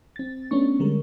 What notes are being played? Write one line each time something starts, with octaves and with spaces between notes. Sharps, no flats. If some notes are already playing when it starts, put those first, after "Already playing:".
C4 A6
A3 B3 C#4 D4 C#6
D3 G3 G#3 A#4